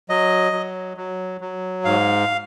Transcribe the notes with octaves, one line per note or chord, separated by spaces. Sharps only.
F#3 D#5
F#3
F#3
F#3
G#2 F5